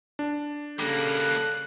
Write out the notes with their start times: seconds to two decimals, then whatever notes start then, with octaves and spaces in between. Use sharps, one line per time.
0.19 D4
0.79 C#3 G3 A#3 A4 F#6